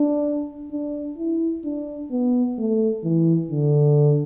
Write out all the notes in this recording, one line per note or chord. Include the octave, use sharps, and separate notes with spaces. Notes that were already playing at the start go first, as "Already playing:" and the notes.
Already playing: D4
D4
E4
D4
B3
A3
E3
D3